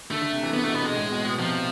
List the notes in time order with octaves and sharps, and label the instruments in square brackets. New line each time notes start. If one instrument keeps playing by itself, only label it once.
[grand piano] D3 [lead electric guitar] A3
[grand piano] D3
C3
E3
[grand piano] D3 [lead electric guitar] B3
[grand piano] B2 [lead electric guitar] A3
[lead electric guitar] B3
[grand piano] B2 [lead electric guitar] G#3
[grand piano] A2
B2
B2
[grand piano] C3 [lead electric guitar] F3